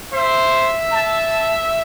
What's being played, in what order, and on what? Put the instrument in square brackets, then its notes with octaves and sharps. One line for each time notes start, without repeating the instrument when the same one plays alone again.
[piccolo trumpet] C5 [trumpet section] E5
[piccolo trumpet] A5